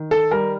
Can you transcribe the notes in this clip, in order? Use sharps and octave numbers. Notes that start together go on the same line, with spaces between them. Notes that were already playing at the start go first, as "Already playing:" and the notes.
Already playing: D#3
A4
G3 A#4